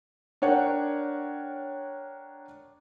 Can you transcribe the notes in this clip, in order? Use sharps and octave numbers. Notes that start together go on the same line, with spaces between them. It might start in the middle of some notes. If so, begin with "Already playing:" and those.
D4 A#4 C#5 F#5 G5